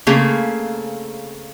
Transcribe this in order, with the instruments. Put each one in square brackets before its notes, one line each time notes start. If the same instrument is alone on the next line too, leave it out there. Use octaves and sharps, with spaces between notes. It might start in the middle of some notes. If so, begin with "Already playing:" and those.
[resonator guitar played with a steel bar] C#3 A3 A#3 C4 G#4